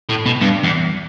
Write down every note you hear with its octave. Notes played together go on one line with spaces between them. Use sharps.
A2
B2
G2
E2